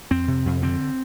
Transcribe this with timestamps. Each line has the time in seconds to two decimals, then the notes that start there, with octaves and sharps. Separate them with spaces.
0.11 F2 C4
0.28 C3
0.46 F2
0.62 D3 C4